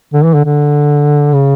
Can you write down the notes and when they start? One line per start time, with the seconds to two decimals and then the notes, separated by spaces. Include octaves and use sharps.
0.13 D3
0.24 E3
0.34 D3
0.44 D3
1.34 C#3